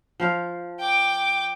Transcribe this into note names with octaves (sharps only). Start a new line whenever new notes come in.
F3 C5 F5
G5 D6